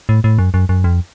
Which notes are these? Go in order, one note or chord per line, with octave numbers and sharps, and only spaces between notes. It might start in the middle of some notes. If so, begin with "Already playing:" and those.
A2
A2
F#2
F#2
F#2
F2